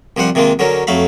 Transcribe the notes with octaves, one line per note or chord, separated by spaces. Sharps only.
C2 F3 G3 C5 F#5
C3 D#3 G#3 A#3 F4
D3 F#3 C#4 A#4
F2 F#3 A3 F5 B5